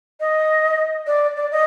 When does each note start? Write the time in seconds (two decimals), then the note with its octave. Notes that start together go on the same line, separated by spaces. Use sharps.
0.20 D#5
1.07 D5
1.36 D5
1.51 D#5